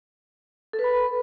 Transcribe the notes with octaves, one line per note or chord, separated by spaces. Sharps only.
A4
B4
B5